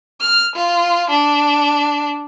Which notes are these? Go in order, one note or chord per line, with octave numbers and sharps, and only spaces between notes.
F6
F4
D4